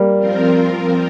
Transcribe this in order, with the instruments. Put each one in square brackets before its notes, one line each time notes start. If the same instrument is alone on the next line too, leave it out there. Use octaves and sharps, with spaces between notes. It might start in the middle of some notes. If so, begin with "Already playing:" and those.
Already playing: [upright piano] G3 A#3
[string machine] F3 C4 F4 A#4